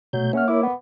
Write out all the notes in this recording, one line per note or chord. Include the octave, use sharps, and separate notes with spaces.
B2 F#3 A3 G6
A#3 C#4 C#5 E5 F#5 F6
E4 A#4 D6
B3